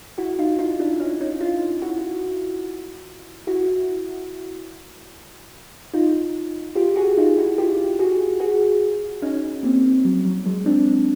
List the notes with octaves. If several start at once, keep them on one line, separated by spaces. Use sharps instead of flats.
E4 F#4
D#4 F4
D#4 F4
D4 E4
C#4 D#4
C#4 D#4
D#4 F4
E4 F#4
E4 F#4
D#4 F4
F4 G4
F#4 G#4
D#4 F4
E4 F#4
F4 G4
F#4 G#4
F#4 G#4
C#4 D#4
A#3 C4
F#3
F#3
F#3 G#3
C4 D4